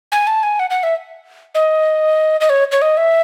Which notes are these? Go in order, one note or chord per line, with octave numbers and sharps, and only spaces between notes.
G#5
A5
G#5
F#5
F#5
E5
D#5
D#5
C#5
C#5
D#5
E5